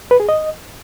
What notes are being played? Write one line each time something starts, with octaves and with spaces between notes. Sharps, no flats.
B4
G#4
D#5